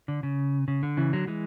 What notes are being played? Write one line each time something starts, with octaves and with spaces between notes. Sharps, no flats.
D3
C#3
C#3
D3
C#3 E3
D3 F#3
E3 G#3